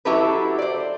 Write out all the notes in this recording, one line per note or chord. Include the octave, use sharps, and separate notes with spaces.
F#3 E4 F#4 G4 A4 B4
C5 D5